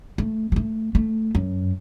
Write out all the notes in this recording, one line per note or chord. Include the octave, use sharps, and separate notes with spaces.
A3
F#3
A3
A3
F#2